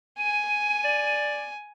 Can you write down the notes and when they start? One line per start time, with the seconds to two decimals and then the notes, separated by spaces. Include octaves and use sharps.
0.19 G#5 D#7
0.84 D5